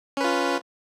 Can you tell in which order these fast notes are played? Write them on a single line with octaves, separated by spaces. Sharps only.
C#4 B4 F4